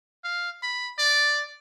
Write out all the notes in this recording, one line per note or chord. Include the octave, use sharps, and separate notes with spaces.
F5
B5
D5